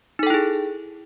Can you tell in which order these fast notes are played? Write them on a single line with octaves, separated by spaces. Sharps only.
D#4 A4 G5 E4 G#4